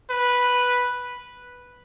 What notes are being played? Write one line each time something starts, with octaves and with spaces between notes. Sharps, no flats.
B4